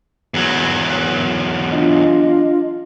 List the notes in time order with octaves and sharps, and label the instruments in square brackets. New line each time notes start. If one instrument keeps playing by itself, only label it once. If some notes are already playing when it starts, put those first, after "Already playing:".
[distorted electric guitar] E2 F#3
[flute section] D4 F4 D#5